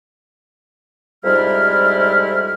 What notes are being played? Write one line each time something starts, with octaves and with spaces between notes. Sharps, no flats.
F2 G#2 C3 G3 E4 F6